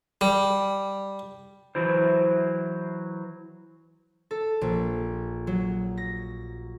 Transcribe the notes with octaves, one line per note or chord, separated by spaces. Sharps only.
G3
E3 F#3 E4 C5
A4
A#1
F#3
A#6